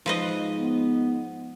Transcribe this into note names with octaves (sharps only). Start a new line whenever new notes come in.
G#2 F3 B4 D#5
B3